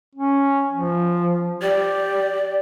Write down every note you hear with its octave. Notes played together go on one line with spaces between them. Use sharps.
C#4
F3
G4 D5